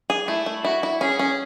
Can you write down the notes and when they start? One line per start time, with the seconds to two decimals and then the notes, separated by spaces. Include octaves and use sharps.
0.10 G#4
0.27 A3 E4
0.46 A3
0.64 E4 F#4
0.83 E4
1.01 C#4 G#4
1.19 C#4